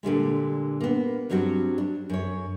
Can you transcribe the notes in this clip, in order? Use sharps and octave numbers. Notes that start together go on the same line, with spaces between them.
A#2 D3 G3 G#3
A#3 B3
G2 F#3 G3 C4 F#4
D4
F#2 C#5